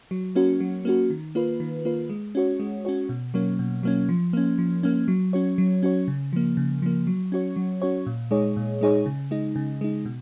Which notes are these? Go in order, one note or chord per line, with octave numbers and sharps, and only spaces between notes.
F#3
A#3 C#4 F#4
F#3
A#3 C#4 F#4
D#3
A#3 F4 B4
D#3
A#3 F4 B4
G#3
C#4 F#4 C#5
G#3
C#4 F#4 C#5
B2
F#3 A#3 C#4
B2
F#3 A#3 C#4
F3
A#3 C#4
F3
A#3 C#4
F#3
C#4 F#4 C#5
F#3
C#4 F#4 C#5
C#3
F3 A#3
C#3
F3 A#3
F#3
C#4 F#4 C#5
F#3
C#4 F#4 C#5
A#2
G#3 D#4 G#4 C#5
A#2
G#3 D#4 G#4 C#5
C#3
G#3 D#4
C#3
G#3 D#4
B2